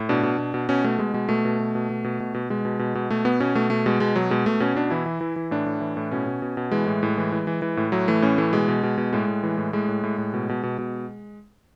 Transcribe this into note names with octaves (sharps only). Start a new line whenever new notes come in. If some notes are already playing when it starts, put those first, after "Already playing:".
Already playing: A2
B2 D4
B2
B2
B2
B2 C#4
B2 A3
B2 G#3
B2 G#3
B2 A3
B2
B2
B2
B2
B2
B2
B2
B2 G#3
B2
B2
B2
B2 A3
B2 B3
B2 C#4
B2 A3
B2 A3
B2 G#3
B2 G#3
B2 F#3
B2 G#3
B2 A3
B2 C#4
B2 D4
E3 E4
E3
E3
E3
A2 D4
A2
E3
A2
B2 C#4
B2
B2
B2
E3 G#3
A2
A2
E3
E3
E3
E3
A2
A2 F#3
E3 A3
A2 C#4
E3 A3
B2 G#3
B2
B2
B2
A2 G#3
A2
E3
A2
A2 G#3
A2
A2
A2
B2
B2
B2
B2